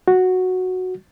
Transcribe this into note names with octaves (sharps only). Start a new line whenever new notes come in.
F#4